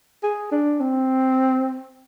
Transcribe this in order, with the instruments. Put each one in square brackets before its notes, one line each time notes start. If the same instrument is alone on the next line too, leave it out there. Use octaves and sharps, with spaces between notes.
[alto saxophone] G#4
D4
C4